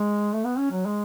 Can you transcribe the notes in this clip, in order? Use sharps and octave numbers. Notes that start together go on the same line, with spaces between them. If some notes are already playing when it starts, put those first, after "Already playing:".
Already playing: G#3
A3
B3
C#4
F#3
G#3